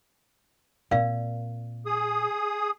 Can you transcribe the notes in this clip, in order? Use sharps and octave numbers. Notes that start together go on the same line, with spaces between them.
A#2 C4 A#4 D5 F5
G#4 D#6